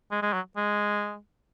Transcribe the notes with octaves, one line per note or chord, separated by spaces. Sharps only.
G#3
G#3
F#3
G#3